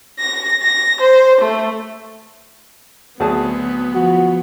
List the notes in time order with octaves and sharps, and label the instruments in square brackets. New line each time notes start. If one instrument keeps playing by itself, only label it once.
[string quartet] A#6
A#6
C5
A3
[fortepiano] D2 G#4 A5 [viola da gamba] F#3 C4 [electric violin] B3
[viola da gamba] F3 [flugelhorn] F#4